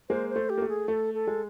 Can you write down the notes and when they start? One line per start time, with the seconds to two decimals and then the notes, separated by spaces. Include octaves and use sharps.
0.09 G#3 A#3 C5
0.30 C5
0.36 A3
0.49 G4
0.57 A#3
0.62 A3
0.69 G#4
0.88 A3 A4
1.14 A4
1.27 G#3